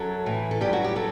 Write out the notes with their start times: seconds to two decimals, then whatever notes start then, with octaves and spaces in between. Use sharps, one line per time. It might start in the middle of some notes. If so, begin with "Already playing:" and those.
Already playing: F#2 F#3 A4
0.26 A2 E3
0.51 A4
0.61 G2 F#3 G4
0.73 F#4
0.84 G4
0.96 F#3 A4